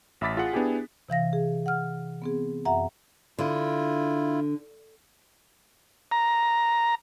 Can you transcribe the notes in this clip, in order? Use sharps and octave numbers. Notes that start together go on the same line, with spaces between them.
A1 E5 B5 D6 A6 B6
F4 G#4 F#5
B3 D4 E4 G4 G#4
C3 E3 F5 A#6
G#4
F#5 F6
B3 C4 G#4
F#2 E5 F#5 A#5
D3 E4 F4
A#5